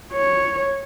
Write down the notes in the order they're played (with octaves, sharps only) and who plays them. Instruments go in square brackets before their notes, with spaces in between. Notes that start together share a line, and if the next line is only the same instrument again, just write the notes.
[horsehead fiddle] C#5